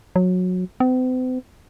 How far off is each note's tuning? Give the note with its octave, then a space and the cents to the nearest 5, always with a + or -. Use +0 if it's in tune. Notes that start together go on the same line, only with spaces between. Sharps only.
F#3 -20
C4 -45